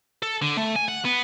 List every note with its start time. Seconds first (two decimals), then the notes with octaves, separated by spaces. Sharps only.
0.22 A4
0.42 D3
0.57 A3
0.76 G#5
0.88 F#5
1.05 B3